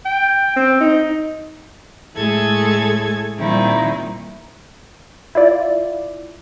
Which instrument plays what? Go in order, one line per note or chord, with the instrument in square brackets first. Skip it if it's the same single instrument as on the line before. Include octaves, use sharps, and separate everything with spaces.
[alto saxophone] G5
C4
D#4
[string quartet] A2 G#3 E4 G#4 A4 G#6
A#2 D#3 G3 C4 D#4 E4
[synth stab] E4 F4 D5